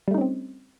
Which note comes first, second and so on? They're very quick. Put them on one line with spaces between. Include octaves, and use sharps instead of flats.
G3 A3 D#4 C#4 C4